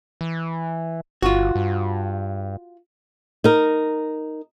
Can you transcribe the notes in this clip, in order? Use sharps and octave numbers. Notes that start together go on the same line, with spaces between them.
E3
G1 F4 F#4
G2
D#4 A#4